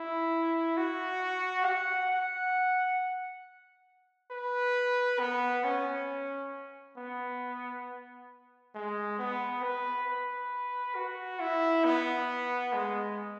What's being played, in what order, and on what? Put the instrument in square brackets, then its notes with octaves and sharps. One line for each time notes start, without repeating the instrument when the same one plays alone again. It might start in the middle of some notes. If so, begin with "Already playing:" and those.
Already playing: [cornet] E4
F#4
F#5
F#5
B4
B3
C#4
B3
G#3
B3
B4
B4
F#4
E4
B3
G#3